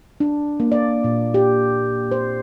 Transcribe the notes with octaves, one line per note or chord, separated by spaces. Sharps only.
D4
A#3
D5
A#2
G4
C5